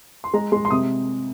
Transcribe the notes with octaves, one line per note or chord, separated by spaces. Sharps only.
C6
G#3 A#5
G#3 C6
C6
C3 D#6